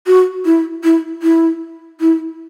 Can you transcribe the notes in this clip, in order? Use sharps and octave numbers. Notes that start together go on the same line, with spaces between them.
F#4
E4
E4
E4
E4